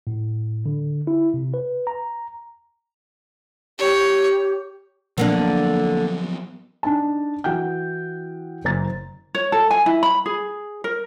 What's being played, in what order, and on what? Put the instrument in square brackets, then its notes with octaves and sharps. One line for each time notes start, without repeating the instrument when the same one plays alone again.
[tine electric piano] A2
D3
E4
C3
B4
A#5
[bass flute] G4 [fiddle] C#5
[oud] D3 A#3 D4 [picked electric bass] F3 F#3 B3
[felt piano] D4 D#4 A5
E3 F#4 F#5 G5 G6
F#1 C5 A#5 A6
[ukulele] C#5
A4
G#5
E4
B5
G#4
A#4